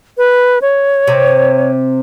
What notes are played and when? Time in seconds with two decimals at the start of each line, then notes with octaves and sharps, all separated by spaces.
0.18 B4
0.62 C#5
1.07 C3